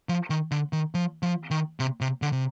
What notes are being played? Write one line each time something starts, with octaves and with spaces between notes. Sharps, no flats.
F3
D#3
D3
D#3
F3
F3
D#3
C3
C3
D3
C3